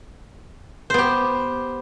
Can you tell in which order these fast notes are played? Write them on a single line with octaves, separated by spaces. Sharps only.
C5 B3 G4